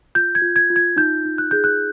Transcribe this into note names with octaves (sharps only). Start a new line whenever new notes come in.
F4 G6
G#6
F4
G#6
F4
G#6
D#4 G6
D#4
F#6
G#4 G6
F#6